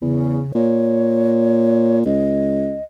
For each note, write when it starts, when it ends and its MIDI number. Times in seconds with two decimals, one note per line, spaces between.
0.02 0.40 40
0.02 0.53 49
0.55 2.01 46
0.55 1.99 73
2.05 2.78 37
2.05 2.83 75